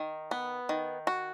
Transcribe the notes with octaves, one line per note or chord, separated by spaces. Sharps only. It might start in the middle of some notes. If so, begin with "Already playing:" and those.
Already playing: D#3
B3
D#3
F#4